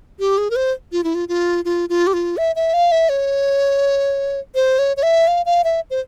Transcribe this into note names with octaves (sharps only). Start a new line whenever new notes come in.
G4
G#4
A#4
C5
F4
E4
F4
F4
F4
F4
G4
F4
E5
E5
F5
E5
C#5
C5
C#5
C#5
E5
F5
F5
E5
C5